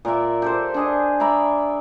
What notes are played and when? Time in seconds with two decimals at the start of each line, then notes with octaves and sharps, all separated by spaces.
0.05 A#2 A#4 D5 E5
0.42 G4 A4 C5
0.74 D4 G#4 D#5
1.20 D5 E5 A#5 B5